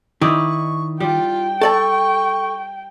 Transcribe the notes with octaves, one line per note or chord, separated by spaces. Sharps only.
D#3 D#4 E4 D5 C#6
G3 F4 G5
A4 D5 A5 C#6